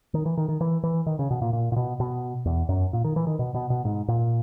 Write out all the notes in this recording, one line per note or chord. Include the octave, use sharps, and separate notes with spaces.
D#3
E3
D#3
D#3
E3
E3
D#3
C#3
B2
A#2
A#2
A#2
B2
B2
E2
F#2
A#2
D#3
E3
D#3
B2
B2
B2
G#2
A#2